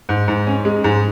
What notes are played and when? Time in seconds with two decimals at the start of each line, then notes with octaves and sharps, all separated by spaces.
0.09 G#2
0.28 G#2
0.47 C#4
0.65 G#3
0.84 G#2